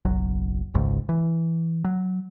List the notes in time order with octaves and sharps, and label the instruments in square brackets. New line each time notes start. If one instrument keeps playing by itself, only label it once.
[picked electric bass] F#1 B1 F#3
G#1 C#2 G#2
E3
F#3